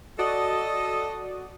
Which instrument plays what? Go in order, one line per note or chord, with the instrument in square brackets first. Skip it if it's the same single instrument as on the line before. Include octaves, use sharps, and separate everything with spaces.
[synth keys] F#4 D5 D#6 [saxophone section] A4 D#5